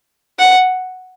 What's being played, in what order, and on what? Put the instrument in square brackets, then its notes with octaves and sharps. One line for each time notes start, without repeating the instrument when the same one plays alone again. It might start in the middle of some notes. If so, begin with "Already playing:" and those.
[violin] F#5